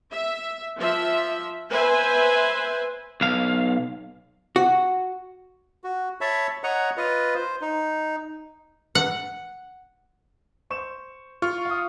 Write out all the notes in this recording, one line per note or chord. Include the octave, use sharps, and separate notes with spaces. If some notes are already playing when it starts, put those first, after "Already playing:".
E5
F3 E5
B4 C5 E5 G#5
B1 F5
F#4
F#4
C#5 E5 A5 B5
C#5 D#5 F#5 A#5
F4 B4 D#5
C5
D#4
F#5
C5 C#6 E7
F4 C#6 F6
F5 D#6